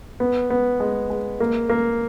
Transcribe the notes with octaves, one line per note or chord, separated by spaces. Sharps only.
B3
B3
G#3
G#3
A#3
A#3